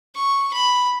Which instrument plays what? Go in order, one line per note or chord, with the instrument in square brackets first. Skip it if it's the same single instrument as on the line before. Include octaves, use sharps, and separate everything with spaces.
[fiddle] C#6
B5